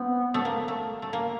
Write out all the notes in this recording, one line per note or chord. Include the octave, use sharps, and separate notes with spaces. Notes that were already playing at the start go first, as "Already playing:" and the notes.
Already playing: B3 C4
A3
A#3
A3
A3
A#3